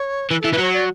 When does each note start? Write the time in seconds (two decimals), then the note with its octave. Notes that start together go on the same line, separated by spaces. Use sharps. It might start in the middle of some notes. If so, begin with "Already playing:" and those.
Already playing: C#5
0.30 E3 B4
0.41 E3 A4
0.52 E3 B4
0.58 F#3 C#5
0.73 D5